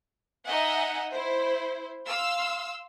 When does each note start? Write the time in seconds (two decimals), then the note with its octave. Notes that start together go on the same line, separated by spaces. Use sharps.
0.45 D#4 D#5 E5 F#5 G#5
1.11 E4 C5
2.07 F5 C6 E6